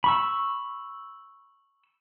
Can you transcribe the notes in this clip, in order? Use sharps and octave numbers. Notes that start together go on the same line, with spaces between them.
B5 C#6 E6